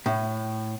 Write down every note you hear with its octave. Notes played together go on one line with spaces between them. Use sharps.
A2